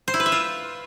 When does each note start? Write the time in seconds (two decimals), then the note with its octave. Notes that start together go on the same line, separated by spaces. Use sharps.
0.08 C5
0.14 E4
0.20 B4
0.26 E5
0.32 F4